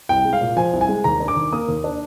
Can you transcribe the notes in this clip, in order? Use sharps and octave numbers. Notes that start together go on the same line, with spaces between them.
C2 G5
G#3
F5
A#2
F3 G#5
C2
G#5
G#3
D#2 A#5
D4
D6
D#3
A#3 D#6
D#2
D4